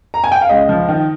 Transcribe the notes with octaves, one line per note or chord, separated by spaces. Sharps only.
A#5
G#5
G5
F5
C#2 D#5
F3
D#3